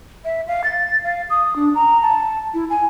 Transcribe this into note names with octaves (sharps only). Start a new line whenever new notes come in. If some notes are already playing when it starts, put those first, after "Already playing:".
E5
F5
A6
F5
D#6
D4
A#5
A5
E4
G#5